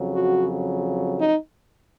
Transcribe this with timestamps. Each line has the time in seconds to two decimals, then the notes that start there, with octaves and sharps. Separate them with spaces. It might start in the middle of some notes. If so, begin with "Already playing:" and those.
Already playing: F2 C#3 F#3
0.14 F#4
1.20 D#4